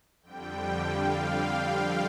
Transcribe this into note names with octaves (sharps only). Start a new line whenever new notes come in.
F2 D3 G3 G5
F5